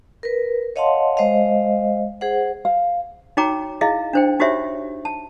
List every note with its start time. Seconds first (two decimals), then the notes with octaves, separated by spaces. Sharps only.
0.23 A#4 B4
0.76 C#5 D#5 F5 F#5 A5 C6
1.17 G#3 C5 D#5 F5
2.21 G#4 C5 F#5
2.65 F5
3.37 D#4 F#4 C#5 G5 A#5 D6
3.81 E4 G#4 D#5 F5
4.13 D4 C5 G5
4.40 D#4 F#4 G4 C5 C#5 E5
5.05 A5